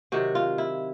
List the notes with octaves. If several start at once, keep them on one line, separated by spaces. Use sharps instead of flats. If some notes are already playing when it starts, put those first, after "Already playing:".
C3 D#3 F#3 F#4
F4
E4